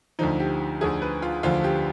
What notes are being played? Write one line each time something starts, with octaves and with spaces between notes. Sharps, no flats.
D2 D3 F3 D#4
G4
D2 D3 F3 G#4
B4
F4
D2 D3 F3 F4
G4